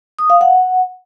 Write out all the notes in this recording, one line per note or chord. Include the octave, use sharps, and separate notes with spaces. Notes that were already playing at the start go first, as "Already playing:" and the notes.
D#6
F5
F#5